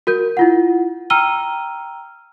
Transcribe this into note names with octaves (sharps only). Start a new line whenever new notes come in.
F#4 A#4 G6
E4 F4 F#5
G5 A#5 E6 F6 D#7 G7